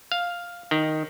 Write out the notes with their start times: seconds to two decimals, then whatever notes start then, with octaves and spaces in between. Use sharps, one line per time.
0.12 F5
0.71 D#3